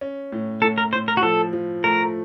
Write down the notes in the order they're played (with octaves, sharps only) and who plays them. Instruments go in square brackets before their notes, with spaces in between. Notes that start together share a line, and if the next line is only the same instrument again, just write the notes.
[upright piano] C#4
A2
[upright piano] A2 [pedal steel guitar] A4
[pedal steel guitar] A#4
[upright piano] A2 [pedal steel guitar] C5
[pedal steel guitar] A#4
F#4
[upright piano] F3 [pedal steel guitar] A4
[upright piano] F3
[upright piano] A3 [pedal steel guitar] A#4